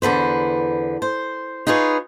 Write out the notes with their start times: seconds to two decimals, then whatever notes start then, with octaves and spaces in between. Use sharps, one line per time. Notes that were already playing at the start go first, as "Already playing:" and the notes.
0.02 E2 D3 B4 C5
1.02 C5
1.67 D#4 F4 G#4 B4 C#5